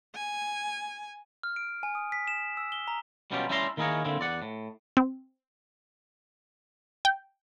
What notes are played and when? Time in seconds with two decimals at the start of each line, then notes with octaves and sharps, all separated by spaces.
0.15 G#5
1.43 F6
1.56 D7
1.83 G#5
1.95 D#6
2.12 B6
2.27 E7
2.57 E6
2.72 G7
2.88 A#5
3.31 B2 F#3 G3 C#4 F4 G4
3.49 G3 C#4 E4 E5 A#5 C6
3.77 D#3 A#3 E4 G#4 A#4 C#5
4.05 D3 A#3 C4 E4
4.20 E2 D5 F#5
4.42 A2
4.97 C4
7.05 G5